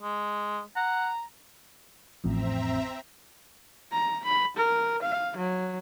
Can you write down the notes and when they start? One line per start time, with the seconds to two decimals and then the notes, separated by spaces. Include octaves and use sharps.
0.02 G#3
0.76 F#5 A#5
2.24 A1 F2 C4 E5 A#5
3.92 A#5
4.25 B5
4.57 A#4
5.03 F5
5.37 F#3